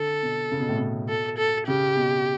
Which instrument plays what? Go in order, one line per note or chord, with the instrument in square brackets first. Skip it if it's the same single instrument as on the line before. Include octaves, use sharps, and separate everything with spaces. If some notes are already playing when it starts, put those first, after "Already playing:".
Already playing: [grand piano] D3 [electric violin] A4
[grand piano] B2
C#3
B2
A2
B2
[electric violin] A4
A4
[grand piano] C#3 [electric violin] G4
[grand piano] B2